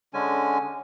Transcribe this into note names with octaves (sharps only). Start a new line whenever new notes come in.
D3 G#3 C#4 G#5